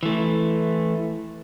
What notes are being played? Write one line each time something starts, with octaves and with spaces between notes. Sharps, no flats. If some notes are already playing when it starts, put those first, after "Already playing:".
E3 A3